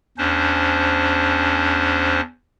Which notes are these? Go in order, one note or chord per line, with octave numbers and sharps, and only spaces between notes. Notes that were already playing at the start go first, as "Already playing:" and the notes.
E2 C#4 D4 C5